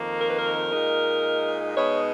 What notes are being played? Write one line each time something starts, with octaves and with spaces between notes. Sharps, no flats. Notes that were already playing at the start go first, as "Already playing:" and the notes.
Already playing: F2 D#3 A#3 D#4
A#4
B4
A#4
A#2 G#3 D#4
B2 G#3 B3 D#4 C#5